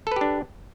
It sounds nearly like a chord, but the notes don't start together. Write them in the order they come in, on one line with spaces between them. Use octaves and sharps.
A4 B4 G4 D4